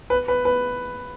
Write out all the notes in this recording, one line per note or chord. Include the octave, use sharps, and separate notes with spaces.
B4
B4
B4